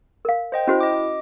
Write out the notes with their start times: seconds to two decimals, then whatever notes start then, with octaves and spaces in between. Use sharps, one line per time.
0.25 A#4 F5
0.52 C5 D#5 G5
0.67 C#4 E4 F#4 C5
0.81 D#5 D6